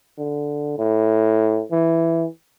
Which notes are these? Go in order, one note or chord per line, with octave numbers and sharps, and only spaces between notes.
D3
A2
E3